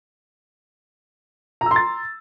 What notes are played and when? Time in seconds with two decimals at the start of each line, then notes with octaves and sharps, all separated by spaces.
1.61 A#5
1.66 E6
1.71 C6
1.76 A6